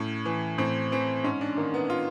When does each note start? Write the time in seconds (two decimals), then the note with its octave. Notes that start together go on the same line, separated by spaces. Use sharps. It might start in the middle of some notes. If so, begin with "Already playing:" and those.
Already playing: A2 C#4
0.26 E3
0.58 A2 C4
0.92 E3 C4
1.24 G#2 C#4
1.41 D4
1.57 D#3 A#3
1.74 B3
1.90 F4